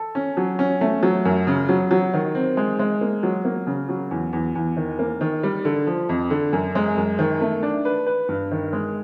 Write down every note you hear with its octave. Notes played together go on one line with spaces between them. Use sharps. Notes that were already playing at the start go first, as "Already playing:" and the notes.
Already playing: A4
C#4
F#3
C#4
A3
F#3
F#2
C#3
F#3
F#3
D#3
C4
G#3
G#3
A#3
F#3
A#3
C#3
F#3
E2
E2
E2
D#3
A#3
D#3
G3
D3
F3
F2
D3
F#2
G#3
F#2
D#3
A3
D4
B4
B4
G2
D#3
G#3